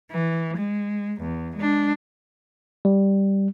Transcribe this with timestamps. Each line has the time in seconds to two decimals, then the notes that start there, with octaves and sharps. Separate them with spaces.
0.11 E3
0.57 G#3
1.21 E2
1.56 G#3 D4
2.85 G3